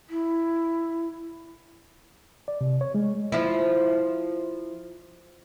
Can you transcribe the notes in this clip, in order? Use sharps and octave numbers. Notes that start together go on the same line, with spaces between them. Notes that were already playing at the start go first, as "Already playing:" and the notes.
E4
D5
C3
C#5
G#3
F3 E4